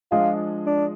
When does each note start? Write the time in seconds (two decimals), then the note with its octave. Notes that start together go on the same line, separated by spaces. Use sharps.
0.11 F3 G#3 D4 F4 G#4 D#5
0.66 D4